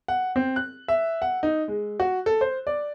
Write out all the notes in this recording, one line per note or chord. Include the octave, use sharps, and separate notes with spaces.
F#5
C4
F#6
E5
F#5
D#4
G#3
F#4
A4
C5
D5